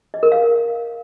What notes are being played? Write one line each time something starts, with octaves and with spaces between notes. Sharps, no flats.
D#5
A#4
F5